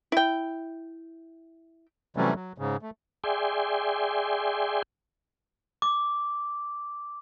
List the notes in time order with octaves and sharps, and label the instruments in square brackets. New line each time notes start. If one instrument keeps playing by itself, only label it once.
[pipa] E4 G5
[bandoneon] C3 E3 F#3 G3 A3 C#4
F#3
G#2 C#3
A3
[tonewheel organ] G#4 D5 E5 G5 G#5 C6
[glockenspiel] D6